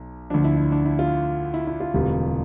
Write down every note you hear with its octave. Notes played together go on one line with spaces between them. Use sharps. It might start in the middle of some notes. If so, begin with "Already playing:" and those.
Already playing: B1
D2 D3 F3 D4
E4
E4
D4
E4
F4
E4
E4
F4
E1 D2 C3 E3 G3